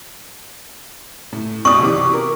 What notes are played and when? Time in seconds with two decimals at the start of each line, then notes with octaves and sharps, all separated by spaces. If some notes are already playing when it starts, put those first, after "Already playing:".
1.32 A2
1.65 B1 D5 C#6 D#6
1.80 C3 E3 D6
2.13 A#4